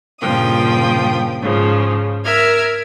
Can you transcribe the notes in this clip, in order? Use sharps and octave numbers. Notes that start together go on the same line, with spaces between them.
G2 A#2 C#3 F3 G5 D#6
G#2 C#3 F3
A#4 E5 F6 G#6